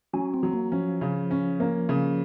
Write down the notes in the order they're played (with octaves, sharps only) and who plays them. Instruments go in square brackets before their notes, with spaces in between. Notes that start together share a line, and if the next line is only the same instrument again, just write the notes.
[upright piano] F#3 [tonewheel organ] C#4
[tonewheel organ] C4
[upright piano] F#3
[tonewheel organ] A#3
[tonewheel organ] F3 [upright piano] C#4
[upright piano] C#3
C#4
A#3
C#3